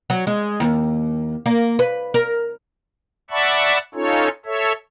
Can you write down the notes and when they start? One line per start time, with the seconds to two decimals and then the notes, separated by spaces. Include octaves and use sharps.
0.10 F#3
0.27 G#3
0.60 D#2
1.46 A#3
1.79 B4
2.14 A#4
3.30 D5 E5 F#5 A5 B5 C#6
3.94 C#4 D#4 F4 A4 C#5
4.46 A4 C#5 E5